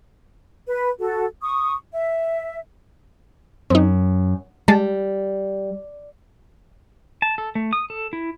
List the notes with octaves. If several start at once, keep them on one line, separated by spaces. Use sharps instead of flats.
B4
F#4 A4
C#6 D#6
E5
F#2 C4 D#4
G3 G#3 A5
A5
A4
A3
D#6
A4
E4